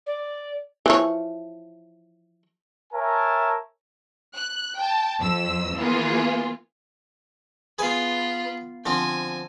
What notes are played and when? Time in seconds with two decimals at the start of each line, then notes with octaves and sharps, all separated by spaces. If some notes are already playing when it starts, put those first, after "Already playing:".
0.06 D5
0.86 E3 F3 C#5
2.93 A#4 C#5 E5 G#5 A5
4.36 F#6
4.77 G5 A5
5.19 F2 E6
5.77 E3 A#3 B3 F4 G#4
7.79 B3 F4 G#4 B4 G#5
8.86 D3 F3 C4 G#5